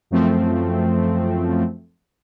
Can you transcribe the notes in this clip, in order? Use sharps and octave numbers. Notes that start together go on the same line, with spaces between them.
F#2 F3 A3 C4